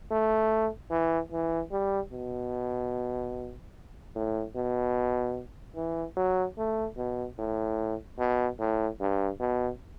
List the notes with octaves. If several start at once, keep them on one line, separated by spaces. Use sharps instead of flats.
A3
E3
E3
G3
B2
A2
B2
E3
F#3
A3
B2
A2
B2
A2
G2
B2